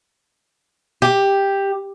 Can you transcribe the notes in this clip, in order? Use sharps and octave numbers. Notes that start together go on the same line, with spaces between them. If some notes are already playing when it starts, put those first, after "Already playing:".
G4